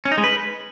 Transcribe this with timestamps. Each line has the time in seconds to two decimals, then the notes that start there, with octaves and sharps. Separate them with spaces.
0.05 C#4
0.12 D#4
0.18 G#3
0.24 B4